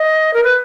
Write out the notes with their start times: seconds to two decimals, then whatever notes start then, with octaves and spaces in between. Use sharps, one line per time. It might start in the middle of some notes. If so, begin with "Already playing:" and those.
Already playing: D#5
0.34 A#4
0.44 B4